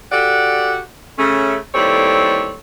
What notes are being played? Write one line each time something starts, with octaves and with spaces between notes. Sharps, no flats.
F#4 G4 A4 D5 F#5
C#3 A3 C#4
D#2 A2 G3 C4 A4 C#5